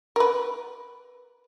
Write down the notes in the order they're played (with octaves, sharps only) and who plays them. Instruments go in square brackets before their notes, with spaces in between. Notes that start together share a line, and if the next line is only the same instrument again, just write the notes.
[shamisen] A#4 B4